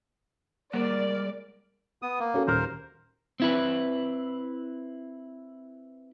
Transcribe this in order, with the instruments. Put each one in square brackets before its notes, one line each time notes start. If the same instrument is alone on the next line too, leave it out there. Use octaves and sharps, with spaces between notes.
[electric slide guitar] G3 G#3 F#5 [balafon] A#3 [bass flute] A#4 [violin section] D5
[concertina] B3 D#6
A#3
[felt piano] C#4 F#4 A4
[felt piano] D#1 F6 [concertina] A#4 C5
[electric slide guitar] C4 E4 B4